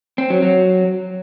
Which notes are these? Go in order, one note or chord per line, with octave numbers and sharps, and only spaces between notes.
C4
F#3
F#3